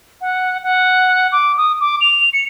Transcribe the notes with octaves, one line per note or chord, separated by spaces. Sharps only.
F#5
F#5
D6
D#6
D6
F7
C#7